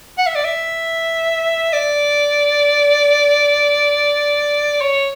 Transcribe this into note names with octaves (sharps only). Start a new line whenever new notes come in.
F#5
E5
D5
E5
D5
C#5